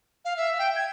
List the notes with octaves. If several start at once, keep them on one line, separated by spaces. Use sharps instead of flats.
F5
E5
G5
G#6